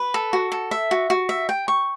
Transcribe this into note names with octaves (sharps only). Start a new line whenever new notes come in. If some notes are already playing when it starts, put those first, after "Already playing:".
Already playing: B4
A4
F#4
A4
E5
F#4
F#4
E5
G5
C#6